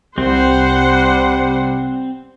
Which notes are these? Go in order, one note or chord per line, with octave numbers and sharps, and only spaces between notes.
C2 G3 C4 C5 F#5